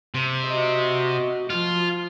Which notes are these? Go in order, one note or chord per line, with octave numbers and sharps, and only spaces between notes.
C3
F#4 D#5
F3 F4